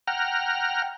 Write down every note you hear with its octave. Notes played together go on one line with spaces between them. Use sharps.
F#5 G5 A#5 F6